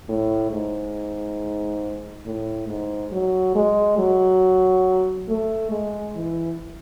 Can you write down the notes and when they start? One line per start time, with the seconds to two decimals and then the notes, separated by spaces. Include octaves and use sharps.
0.09 A2
0.52 G#2
2.26 A2
2.68 G#2
3.12 F#3
3.55 G#3
3.98 F#3
5.29 A3
5.71 G#3
6.15 E3